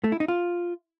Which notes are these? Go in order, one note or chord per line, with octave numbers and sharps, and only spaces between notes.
A3
E4
D#4
F4